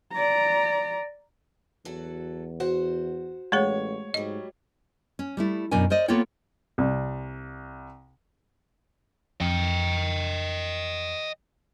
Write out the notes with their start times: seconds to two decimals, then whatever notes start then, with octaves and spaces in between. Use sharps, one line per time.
0.13 D5 A#5
1.85 E2 F#3 F#4 A4
2.60 F#4 C5 F#5
3.52 A1 G#3 A3 G#4 C#5
4.14 G#2 F#3 G3 D#5
5.19 C#4
5.37 G3 A3 E4
5.71 F#2 B2 D4 A#4 G#5
5.90 A#4 C5 D5 D#5
6.08 A#3 B3 F4 A4 C#5 G5
6.78 C2
9.41 F2 D#5 G5